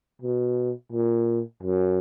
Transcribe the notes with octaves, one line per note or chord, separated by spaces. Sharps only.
B2
A#2
F#2